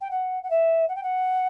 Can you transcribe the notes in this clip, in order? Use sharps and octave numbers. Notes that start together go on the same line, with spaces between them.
G5
F#5
F#5
E5
F#5
G5
F#5